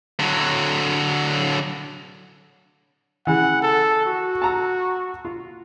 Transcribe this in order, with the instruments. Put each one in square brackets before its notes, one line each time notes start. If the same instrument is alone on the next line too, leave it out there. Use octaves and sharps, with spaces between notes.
[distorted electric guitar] D3 F#3
[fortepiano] C#3 E3 [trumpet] F#5
[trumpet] A4
F#4
[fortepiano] A5 A#5 E6
F4